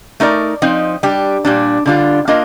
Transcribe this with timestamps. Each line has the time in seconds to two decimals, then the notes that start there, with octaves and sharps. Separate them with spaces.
0.20 A3 D#4 A#4 D5
0.62 F3 C4 D#4
1.03 G3 D4 G4
1.45 A#2 G3 D4
1.86 D3 G3 D4 F4
2.28 A#3 D4 F4 A#4 D#5